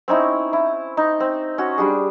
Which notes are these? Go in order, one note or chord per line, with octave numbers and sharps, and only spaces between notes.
C4 C#4 D#4 E4
E4
D#4
C4
C#4 F#4
G3 D4 G#4